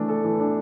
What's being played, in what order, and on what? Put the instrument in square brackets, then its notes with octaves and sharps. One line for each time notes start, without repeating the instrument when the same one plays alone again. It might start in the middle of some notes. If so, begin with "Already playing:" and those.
Already playing: [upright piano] E3 A3 D4
A4
E3
D4